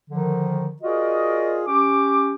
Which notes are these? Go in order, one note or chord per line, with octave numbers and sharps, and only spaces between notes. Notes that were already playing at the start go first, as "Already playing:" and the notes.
D3 D#3 F3
F4 F#4 G#4 A#4 D5 D#5
C#4 G4 D6